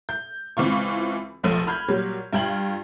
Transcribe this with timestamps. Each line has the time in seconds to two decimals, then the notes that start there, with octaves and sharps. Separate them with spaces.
0.09 G6
0.57 C#2 E3 C4 F4 C#6
1.43 F1 A#1 F3 A3 D#7
1.67 B5 F6 G6 G#6
1.88 A#2 F#3 G3
2.33 G2 F4 G5 G#6 F#7